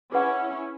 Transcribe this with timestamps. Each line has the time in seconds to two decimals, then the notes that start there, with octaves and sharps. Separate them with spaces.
0.12 C#4 E4 G#4 B4 F#5 B5